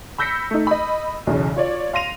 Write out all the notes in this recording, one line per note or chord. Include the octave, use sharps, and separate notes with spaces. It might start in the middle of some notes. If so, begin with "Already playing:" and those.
B5 E6 G6 A#6 B6 C#7
A3 D#4
D#5 B5
B1 E2 C#3
F4 C#5 D5
F5 C6 A#6 D#7 F7